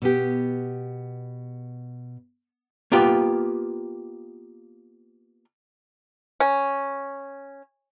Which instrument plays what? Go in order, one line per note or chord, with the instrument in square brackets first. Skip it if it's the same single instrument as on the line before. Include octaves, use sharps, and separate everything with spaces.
[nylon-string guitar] B2 B3 G4
[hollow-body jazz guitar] A#3 B3 F4 G4
[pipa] C#4